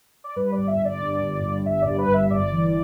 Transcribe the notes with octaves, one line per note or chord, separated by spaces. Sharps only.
D5
G2 B4
D5
G1
E5
G1
D5
G2
G1
G2
G1 E5
G2 D5
B4
G1
E5
E5
G1 D5
E3